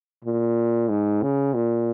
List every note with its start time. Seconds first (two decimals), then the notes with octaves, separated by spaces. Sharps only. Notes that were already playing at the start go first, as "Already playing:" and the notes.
0.24 A#2
0.89 G#2
1.23 C#3
1.54 A#2